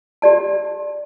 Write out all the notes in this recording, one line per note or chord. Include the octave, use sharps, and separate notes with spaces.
G4 D5 A5